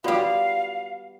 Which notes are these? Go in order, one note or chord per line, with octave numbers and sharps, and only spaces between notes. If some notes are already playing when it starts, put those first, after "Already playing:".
G3 B3 F4 F#4 D5 F5